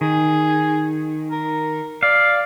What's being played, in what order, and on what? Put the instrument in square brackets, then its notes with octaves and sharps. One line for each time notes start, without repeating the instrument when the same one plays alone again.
[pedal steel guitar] D#3 [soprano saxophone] G#4
[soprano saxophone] A#4
[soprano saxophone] D5 [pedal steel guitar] F5